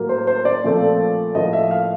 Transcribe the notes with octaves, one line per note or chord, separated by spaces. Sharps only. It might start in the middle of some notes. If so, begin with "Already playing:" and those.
Already playing: A2 F#3 A#3
C5
C5
D5
A#2 F3 A3 C4
A2 F3 A#3 D#5
E5
F5